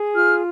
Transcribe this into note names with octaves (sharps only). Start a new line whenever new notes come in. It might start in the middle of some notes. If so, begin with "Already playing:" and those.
Already playing: G#4
F4 F6